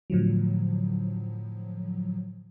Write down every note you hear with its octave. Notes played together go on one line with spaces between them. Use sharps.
A2 D3 F3 F#3